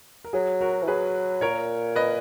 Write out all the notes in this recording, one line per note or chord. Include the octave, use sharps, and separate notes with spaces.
A#4
F#3 G#4
F#4 A#4
E3
F#3 G#4 B4
A#2 A#4 C#5
B4 D#5